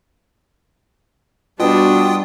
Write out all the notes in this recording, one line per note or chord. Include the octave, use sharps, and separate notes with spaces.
B2 G3 D4 F4 G5 D#6